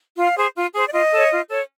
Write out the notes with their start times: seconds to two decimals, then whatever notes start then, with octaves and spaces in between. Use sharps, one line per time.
0.18 F4 F5
0.37 G#4 C5
0.56 F4
0.75 G#4 C5
0.87 D5
0.93 F4 D#5
1.12 A4 C#5
1.31 F4
1.49 A4 C#5